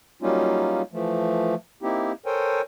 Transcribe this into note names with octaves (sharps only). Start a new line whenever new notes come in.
F#3 G3 A#3 C#4 D#4 F4
E3 F3 A3
A#3 C4 D#4 E4 G4
A4 A#4 C5 C#5 G5 G#5